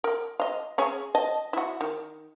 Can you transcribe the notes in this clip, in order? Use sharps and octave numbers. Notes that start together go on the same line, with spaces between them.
A#4
D#5 F5
C#4 G#4 C#5
D#5 A5
E4 F#4
D#3